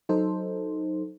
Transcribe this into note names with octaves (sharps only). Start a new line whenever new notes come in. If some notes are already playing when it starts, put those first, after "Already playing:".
F#3 D#4 A4 C5